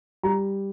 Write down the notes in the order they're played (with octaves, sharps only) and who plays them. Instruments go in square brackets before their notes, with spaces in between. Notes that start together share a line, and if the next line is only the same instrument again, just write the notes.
[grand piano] G3 A#5